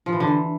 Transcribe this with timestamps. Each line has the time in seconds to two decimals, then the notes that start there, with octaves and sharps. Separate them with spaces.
0.06 F3
0.13 E3
0.20 D3
0.27 E3